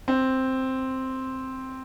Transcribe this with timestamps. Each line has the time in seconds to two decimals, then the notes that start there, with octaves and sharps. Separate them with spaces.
0.08 C4